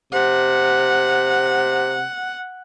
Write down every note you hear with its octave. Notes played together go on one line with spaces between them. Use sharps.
C3 F#5